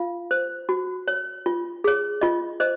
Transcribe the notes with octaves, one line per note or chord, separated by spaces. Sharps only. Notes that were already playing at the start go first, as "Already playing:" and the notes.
Already playing: F4 F5
C5
F#4
C#5
F4
G#4 C#5
F4 D#5
C5 D#5